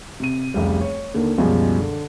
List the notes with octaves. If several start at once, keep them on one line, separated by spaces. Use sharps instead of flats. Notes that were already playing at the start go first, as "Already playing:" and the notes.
C3 D#7
F1 C#2 G3
C#5
D#2 D3 A#3
C#2 F#2 B2 F3 G3 G#3
D3